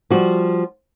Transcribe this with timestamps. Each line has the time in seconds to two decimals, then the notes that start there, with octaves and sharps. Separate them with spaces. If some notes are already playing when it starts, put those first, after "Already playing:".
0.10 F3 G3 F#4